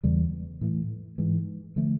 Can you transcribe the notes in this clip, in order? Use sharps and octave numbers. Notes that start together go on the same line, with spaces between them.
E2 C#3 E3 G3
A2 E3 A3
G#2 E3 G#3
D3 F3 A3